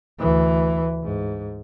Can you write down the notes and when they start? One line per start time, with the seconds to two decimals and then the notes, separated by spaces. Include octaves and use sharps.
0.19 D2 E3
1.03 G#2